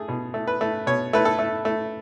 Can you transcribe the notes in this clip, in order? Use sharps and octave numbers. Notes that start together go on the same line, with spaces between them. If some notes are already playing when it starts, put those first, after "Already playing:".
Already playing: A3 G#4
B2
A3
B4
A3
B2 C#5
A3 B4
A4
A3
A3